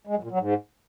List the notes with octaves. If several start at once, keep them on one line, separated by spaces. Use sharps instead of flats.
G#3
F#2
A#2
F#3
G#2